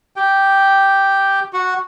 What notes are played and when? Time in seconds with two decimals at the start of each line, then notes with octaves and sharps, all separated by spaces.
0.16 G4 G5
1.53 F#4 F#5